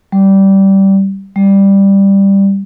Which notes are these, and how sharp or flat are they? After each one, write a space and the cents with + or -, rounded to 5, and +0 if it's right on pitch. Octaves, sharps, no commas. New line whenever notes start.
G3 -15
G3 +5